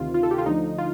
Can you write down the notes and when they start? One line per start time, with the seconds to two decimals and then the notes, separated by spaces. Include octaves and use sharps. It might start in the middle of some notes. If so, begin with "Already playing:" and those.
Already playing: D2 C3 D#3 F4
0.14 F4
0.23 A4
0.31 G4
0.38 F4
0.46 D2 D3 F3 D#4
0.78 F4